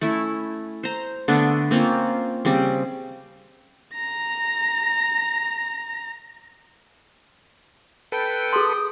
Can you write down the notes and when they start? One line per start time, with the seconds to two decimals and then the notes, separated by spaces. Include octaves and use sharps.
0.01 A3 C#4 E4
0.83 C5 A#5
1.28 D3 A3 B3 D4
1.71 A#3 C4 C#4 F4
2.45 C#3 G3 C4
3.95 A#5 A#6
8.12 A4 B4 G5
8.53 G#4 C6 D#6